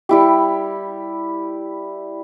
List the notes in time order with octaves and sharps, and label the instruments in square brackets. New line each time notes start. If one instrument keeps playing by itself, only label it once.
[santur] G3 E4 G4